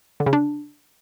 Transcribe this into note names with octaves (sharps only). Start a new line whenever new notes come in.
D3
C#3
D4